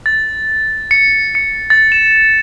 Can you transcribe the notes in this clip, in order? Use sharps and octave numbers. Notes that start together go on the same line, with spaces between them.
A6
C#7
C#7
A6
E7